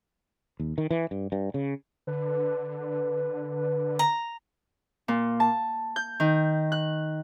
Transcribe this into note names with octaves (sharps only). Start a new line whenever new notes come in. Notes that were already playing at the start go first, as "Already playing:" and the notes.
D#2
D#3
E3
G2
G2
C#3
D3 B4
A#5
A#2
A5
G6
D#3
F#6